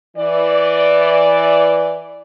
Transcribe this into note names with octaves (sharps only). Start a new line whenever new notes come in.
E3 D5